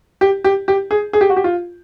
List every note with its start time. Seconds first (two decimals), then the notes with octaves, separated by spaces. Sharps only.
0.21 G4
0.44 G4
0.68 G4
0.91 G#4
1.13 G#4
1.21 G4
1.30 F#4
1.37 G4
1.44 F4